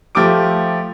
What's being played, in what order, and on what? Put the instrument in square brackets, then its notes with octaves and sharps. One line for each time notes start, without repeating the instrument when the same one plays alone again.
[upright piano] F3 A3 G4 D6 D7